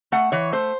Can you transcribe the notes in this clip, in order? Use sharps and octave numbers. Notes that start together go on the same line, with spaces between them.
A3 F#5
E3 C#5
A3 C5